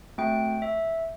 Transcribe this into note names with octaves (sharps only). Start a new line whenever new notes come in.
A3 C4 F#4 G5
E5